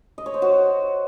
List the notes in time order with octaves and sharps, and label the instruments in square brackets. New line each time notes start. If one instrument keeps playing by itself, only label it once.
[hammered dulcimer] D#5
C#5
C5
F#4